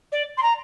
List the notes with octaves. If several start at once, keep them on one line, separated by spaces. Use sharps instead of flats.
D5
C6
A#5